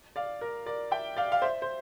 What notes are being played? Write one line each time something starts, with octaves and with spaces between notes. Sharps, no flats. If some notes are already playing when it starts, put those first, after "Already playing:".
D5 F5
A#4 D5
A#4 D5
E5 G5
D5 F5
F5
C5 E5
C5